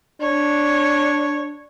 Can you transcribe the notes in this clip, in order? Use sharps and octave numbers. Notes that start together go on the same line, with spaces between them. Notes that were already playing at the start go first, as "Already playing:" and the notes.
D4 C#5